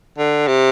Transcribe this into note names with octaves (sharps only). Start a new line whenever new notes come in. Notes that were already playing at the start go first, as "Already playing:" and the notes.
D3
C3